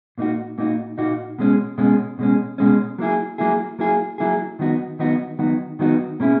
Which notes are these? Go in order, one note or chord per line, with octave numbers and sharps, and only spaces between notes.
A#2 A#3 D#4 F#4
A#2 A#3 D#4 F#4
A#2 A#3 D#4 F#4
B2 G#3 C#4
B2 G#3 C#4
B2 G#3 C#4
B2 G#3 C#4
F#3 A#3 E4 G#4
F#3 A#3 E4 G#4
F#3 A#3 E4 G#4
F#3 A#3 E4 G#4
D#3 F#3 B3 D#4 F#4
D#3 F#3 B3 D#4 F#4
D#3 F#3 B3 D#4 F#4
D#3 F#3 B3 D#4 F#4
B2 A#3 C#4 E4 G#4